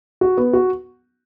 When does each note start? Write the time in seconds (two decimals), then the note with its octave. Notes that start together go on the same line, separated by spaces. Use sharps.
0.21 F#4
0.37 B3
0.53 F#4